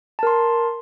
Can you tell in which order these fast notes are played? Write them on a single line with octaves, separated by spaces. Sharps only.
A5 A#4 C6